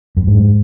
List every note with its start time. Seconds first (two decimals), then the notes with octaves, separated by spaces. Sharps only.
0.17 F#2
0.27 G#2